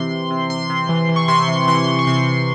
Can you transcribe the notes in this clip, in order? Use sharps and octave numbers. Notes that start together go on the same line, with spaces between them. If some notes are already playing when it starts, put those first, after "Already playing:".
Already playing: C3 E3 C6
C3
C3
C3 C6
C3
E3
E3
C#6
C3 C6
E3
E3 C6
E3
C#6
C3 C6
C3